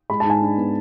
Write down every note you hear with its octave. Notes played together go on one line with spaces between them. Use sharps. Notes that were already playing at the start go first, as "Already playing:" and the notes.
G#3 B5
G#2 A5
G#5
D4
B3